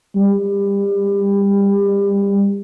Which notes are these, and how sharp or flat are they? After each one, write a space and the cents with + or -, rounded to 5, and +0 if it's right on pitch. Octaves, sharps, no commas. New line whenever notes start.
G3 +30